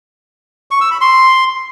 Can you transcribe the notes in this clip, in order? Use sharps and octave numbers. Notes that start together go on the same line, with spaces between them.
C#6
E6
B5
C6